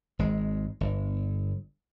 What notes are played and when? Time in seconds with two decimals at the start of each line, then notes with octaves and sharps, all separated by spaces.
0.19 G#1 G#3
0.81 G1